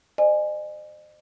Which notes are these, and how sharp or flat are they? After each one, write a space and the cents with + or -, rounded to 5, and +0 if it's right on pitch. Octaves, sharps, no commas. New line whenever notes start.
C5 +0 D#5 -40 G#5 +0